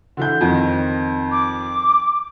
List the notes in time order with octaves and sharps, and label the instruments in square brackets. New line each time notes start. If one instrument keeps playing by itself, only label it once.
[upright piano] D3 E3 G6
F2 D#3
[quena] D6